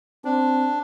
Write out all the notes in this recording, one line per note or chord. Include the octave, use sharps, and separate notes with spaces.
C4 D4